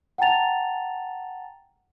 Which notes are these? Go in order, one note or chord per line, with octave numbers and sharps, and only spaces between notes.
F#5 G5 A5 A#5 A6 F7